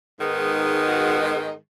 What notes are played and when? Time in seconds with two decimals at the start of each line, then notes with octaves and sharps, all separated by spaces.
0.19 G#2 D#3 G#3 B3 D#4
0.88 F#4
1.21 D#4